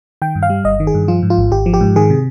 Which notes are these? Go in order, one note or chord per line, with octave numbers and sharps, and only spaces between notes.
D#3 G5
G2
F5
G3
G1 D#5
D#3
G#4
G2
F3 F4
G#2
F4
G#1
G#1 G4
F3
G4
G#2
D#3 G#4
C3